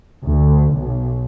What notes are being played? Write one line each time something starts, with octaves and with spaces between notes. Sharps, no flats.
D2
B1